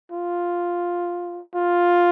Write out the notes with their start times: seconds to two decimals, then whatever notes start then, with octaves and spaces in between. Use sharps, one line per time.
0.12 F4
1.55 F4